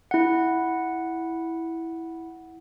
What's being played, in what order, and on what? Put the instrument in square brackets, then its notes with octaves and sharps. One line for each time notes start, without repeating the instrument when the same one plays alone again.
[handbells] E4 F#5